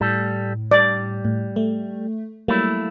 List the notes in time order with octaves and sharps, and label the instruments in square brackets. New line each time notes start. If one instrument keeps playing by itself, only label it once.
[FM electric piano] A2 [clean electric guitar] G3 A4
[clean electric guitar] G3 [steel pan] D5
[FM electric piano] A2
A3
[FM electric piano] F#3 G3 A#3 [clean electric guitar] A3 E4